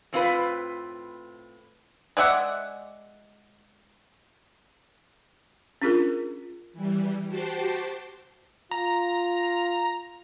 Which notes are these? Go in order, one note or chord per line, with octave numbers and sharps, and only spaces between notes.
A2 C4 F4 B4
G#3 D5 E5 F#5
C#4 D4 F4 G#4 A#4
E3 G3
F#4 G4 C5 G5 A5 C6
F4 A#5